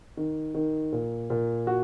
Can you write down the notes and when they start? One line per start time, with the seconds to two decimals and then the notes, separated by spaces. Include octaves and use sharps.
0.17 D#3
0.55 D#3
0.93 A#2
1.30 A#2
1.67 F#4